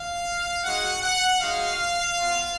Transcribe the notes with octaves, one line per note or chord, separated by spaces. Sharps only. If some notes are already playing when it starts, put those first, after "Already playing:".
Already playing: F5
G#3 D#4 F#4 F#5
F#5
G#3 D#4 F#4 F5
B3 F4